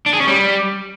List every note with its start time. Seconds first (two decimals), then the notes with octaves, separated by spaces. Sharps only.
0.06 D4
0.13 G#4
0.20 C#4
0.27 G3